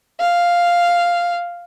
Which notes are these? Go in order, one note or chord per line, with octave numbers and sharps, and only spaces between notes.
F5